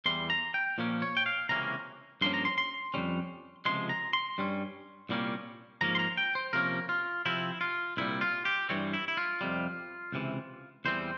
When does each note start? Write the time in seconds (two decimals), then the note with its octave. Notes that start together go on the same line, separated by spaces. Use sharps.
0.06 E2 E3 G3 C6
0.30 A#5
0.54 G5
0.78 A#2 F3 A#3 C#4
1.02 C#5
1.17 G5
1.26 F5
1.49 C#2 C3 E3 A#3 C#4 A#5
2.21 G2 F3 A#3 C#4 C6
2.34 A#5
2.45 C6
2.58 C6
2.94 F2 C#3 G3 C#4
3.65 C#2 C3 F3 G#3 C6
3.89 A#5
4.13 C6
4.38 G2 G3 C#4
5.09 C2 A#2 G3 A#3 C#4
5.81 G#2 F3 A#3 C#4 A#5
5.95 C6
5.99 A#5
6.17 G5
6.35 C5
6.53 C3 F3 A#3 C#4 A#4
6.89 F4
7.26 C3 F3 C4 E4
7.61 F4
7.97 C2 A#2 G3 E4
8.21 F4
8.45 G4
8.69 G2 E3 G3 C4 C#5
8.93 E4
9.08 E4
9.17 F4
9.41 F2 C3 G3
10.12 C#2 C3 E3
10.85 E2 E3 G3 C4 C5